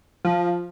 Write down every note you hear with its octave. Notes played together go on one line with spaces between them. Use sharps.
F3